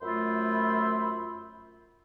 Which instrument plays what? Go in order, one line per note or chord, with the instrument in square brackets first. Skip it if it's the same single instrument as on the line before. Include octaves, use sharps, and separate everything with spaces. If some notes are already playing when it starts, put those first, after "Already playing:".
[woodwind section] F#2 A3 F4 C5 E5 B5